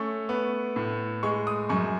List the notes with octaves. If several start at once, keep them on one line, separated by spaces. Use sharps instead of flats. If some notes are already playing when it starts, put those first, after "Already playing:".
Already playing: A3 C#4 C#6
B3
A2
G#3 C#6
D#6
F#2 C#6